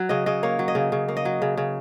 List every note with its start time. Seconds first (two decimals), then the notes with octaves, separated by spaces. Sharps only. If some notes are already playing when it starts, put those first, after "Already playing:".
Already playing: F#3
0.09 C#3 D#5
0.26 C#3 D#5
0.43 A#3 C#5
0.59 F#3
0.68 D#5
0.75 C#3
0.92 C#3
1.08 A#3
1.17 D#5
1.25 F#3
1.42 C#3
1.57 C#3